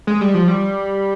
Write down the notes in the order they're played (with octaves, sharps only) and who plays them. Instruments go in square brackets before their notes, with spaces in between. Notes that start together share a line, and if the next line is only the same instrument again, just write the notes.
[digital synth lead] G#3
G3
F3
G3